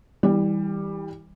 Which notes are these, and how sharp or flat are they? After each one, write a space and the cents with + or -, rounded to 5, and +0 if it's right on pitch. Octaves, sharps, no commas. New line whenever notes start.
E3 -30 G3 +10